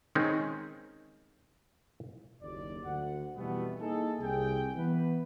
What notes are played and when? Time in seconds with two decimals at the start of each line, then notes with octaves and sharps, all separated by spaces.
0.15 D#3 G#3 C4 C#4 D#4
2.42 F#1 D#2 D5
2.83 D2 F#5
3.36 F2 B2 E3 G3 A3 B3
3.80 A#3 D#4 E4 G#4 A4
4.20 C2 G#4 G5
4.75 E3 B3 B4